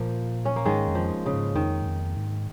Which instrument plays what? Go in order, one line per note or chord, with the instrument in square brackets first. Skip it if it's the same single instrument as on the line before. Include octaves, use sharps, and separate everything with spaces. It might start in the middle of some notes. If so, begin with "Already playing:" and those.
Already playing: [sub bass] A#2 [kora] F3 A#3
[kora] C#4
A#3
[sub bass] G#2 [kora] D#3 G#3
[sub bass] F2
[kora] F3
C#3
[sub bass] G#2
[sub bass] F2 [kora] D#3
[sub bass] G#2
F2
G#2